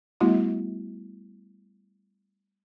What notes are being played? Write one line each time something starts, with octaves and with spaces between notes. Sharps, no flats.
G3 A3 B3 E4 F#4